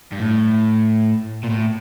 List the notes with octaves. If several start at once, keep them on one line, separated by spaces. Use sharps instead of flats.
G2
A2
A#2
A2